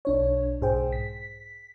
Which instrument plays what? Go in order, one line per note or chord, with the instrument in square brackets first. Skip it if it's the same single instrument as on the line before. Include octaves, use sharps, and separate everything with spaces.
[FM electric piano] B1 D4 C#5
B1 G#2 G#4 C5 G5
B6